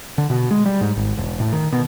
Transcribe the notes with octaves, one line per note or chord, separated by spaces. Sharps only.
D3
B2
G#3
G3
G#2
G#1
E1
A2
D#3
B2